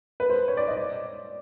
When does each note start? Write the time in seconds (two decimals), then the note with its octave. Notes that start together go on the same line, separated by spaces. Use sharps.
0.20 B4
0.30 C5
0.48 C#5
0.57 D5
0.68 D#5
0.77 D5